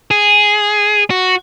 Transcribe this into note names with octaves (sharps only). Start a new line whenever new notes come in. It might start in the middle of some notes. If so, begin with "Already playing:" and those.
G#4
F#4